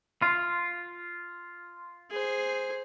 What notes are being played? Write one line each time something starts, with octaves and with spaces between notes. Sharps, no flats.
F4
G#4 C5